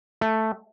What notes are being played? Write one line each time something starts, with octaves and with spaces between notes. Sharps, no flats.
A3